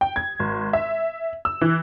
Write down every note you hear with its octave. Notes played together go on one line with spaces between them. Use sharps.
G5
G#6
G#1
E5
E6
E3